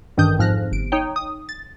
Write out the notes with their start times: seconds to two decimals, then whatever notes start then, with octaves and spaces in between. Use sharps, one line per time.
0.17 A1 G2 D#3 D4 D#6 G6
0.39 F2 G#2 F3 F6 F#6 A#6
0.72 G1 D7
0.92 D#4 C#5 G5
1.16 D#6
1.49 A6